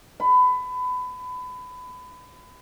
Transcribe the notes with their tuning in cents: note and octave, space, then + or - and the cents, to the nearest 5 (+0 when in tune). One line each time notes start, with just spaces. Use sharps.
B5 +25